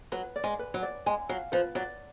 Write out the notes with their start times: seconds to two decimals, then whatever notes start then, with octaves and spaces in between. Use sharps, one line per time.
0.12 F#3 B4
0.36 D5
0.44 G#3
0.59 B4
0.74 F#3
0.82 D5
1.06 G#3 G#5
1.29 F#3 F5
1.52 F3 B4
1.75 F#3 D5